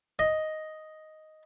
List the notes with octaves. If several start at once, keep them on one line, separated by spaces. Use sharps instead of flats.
D#5